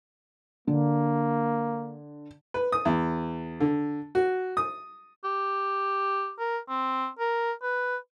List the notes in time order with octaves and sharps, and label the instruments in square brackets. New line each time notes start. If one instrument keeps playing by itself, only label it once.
[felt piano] D3 [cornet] A#3
[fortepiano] B4
D#6
E2
D3
F#4
D#6
[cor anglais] G4
A#4
C4
A#4
B4